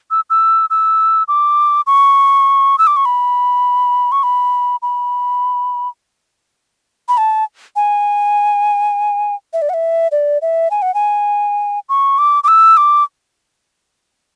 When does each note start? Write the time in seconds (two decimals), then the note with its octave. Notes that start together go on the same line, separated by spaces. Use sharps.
0.11 E6
0.30 E6
0.70 E6
1.28 D6
1.87 C#6
2.78 E6
2.87 D6
2.96 C#6
3.05 B5
4.12 C#6
4.23 B5
4.82 B5
7.08 B5
7.18 A5
7.76 G#5
9.53 E5
9.62 D5
9.69 F#5
9.74 E5
10.12 D5
10.42 E5
10.71 G#5
10.82 F#5
10.94 G#5
11.89 C#6
12.18 D6
12.44 D6
12.48 E6
12.77 D6